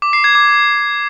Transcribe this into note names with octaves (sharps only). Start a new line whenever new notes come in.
D6
C7
G#6
D6